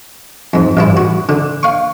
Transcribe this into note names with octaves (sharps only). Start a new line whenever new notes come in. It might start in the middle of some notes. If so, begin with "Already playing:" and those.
F2 G#2
A1 G2 E4
F#4
D3
F5 C#6